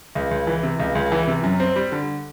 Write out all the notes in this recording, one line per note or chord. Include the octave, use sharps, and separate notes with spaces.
C#2
C#2
E3
C3
C#2
C#2
E3
C3
F#2
C4
G3
D3